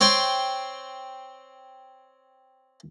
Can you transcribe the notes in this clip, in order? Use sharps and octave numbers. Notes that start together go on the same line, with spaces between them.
C4 C#5 G5 C6